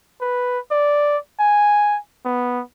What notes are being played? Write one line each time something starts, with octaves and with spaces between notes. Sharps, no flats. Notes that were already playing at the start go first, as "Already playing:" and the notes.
B4
D5
G#5
B3